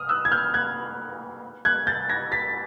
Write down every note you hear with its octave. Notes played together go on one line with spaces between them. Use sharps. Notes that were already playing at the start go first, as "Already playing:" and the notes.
Already playing: D#6 F6
E6 F#6
G#6
F6 G6
F#6 G#6
F#6 G#6
G6 A6
G#6 A#6
A6 B6